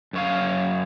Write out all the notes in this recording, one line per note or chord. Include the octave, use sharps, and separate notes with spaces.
F#2 C#5 F5